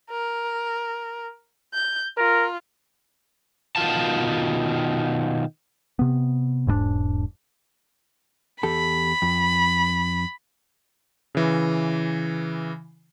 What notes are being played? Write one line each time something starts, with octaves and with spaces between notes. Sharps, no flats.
A#4
G6
F4 A#4
B2 D#3 B3 F4 A5
C3 B3
E1 G#2 G#3 D4
E2 G4 A4 B5
F2
C#3 E3